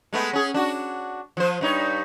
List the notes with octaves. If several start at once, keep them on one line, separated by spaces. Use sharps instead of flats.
G#3 A3 B3
C#4 G#4
D4 F#4
F3 C5
G2 D#4 C#5